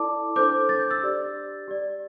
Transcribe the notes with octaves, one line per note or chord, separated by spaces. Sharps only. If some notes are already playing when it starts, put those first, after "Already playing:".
Already playing: E4 A4 D5 A5 D6
D4 A4 C5 D6 G6
A6
G6
E6 A6
D4 G4 D5
G4 D5